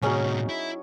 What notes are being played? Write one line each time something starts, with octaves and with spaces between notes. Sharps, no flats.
A2 C3 F#3 C#4 D#4 G#4 A#4 C#5
E4